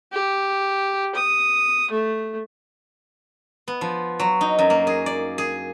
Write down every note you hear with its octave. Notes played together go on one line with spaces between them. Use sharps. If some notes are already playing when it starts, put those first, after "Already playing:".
G4
D#6
A3
B3
F3
F#3
D#4
F#2
A#3
G#4
D5
G#4